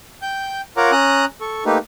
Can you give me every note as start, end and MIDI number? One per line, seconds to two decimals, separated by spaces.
0.22 0.61 79
0.22 0.61 91
0.77 0.91 65
0.77 0.91 70
0.77 0.91 73
0.77 0.91 78
0.77 0.91 82
0.77 0.91 86
0.92 1.25 61
0.92 1.25 82
0.92 1.25 87
0.92 1.25 90
1.41 1.64 69
1.41 1.64 85
1.66 1.78 57
1.66 1.78 58
1.66 1.78 63
1.66 1.78 67
1.66 1.78 71